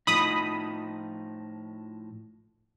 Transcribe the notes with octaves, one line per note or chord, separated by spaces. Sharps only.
A2 F3 D#4 B5 D#6